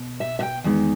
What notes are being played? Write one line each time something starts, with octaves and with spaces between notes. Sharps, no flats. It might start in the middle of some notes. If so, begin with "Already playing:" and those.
Already playing: B2
E5
E5
G5
E2 D#3 G#3